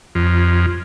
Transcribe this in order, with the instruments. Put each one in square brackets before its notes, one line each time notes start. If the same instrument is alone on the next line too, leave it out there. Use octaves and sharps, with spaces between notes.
[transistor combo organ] F2